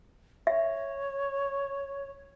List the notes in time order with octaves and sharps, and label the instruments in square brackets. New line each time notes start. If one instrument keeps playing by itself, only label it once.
[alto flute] C#5 [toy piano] E5